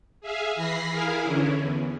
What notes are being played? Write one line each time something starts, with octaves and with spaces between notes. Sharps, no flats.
G#4 E5 F5 G#5
E3 B5 A#6 C7
E4 G#4 A#4 F5 G#5
D3 E3 C#4 E4
E2